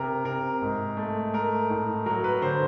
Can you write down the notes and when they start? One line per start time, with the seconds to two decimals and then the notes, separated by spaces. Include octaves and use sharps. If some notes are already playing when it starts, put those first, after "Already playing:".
Already playing: C3 A#4
0.24 C3 A#4
0.61 G#2
0.97 A3
1.33 A3 A#4
1.70 A2
2.06 F#3 A#4
2.24 B4
2.41 D3 C5